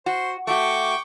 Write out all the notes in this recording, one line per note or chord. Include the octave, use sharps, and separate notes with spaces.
F#4 C5
A3 F#4 G5 C#6 D6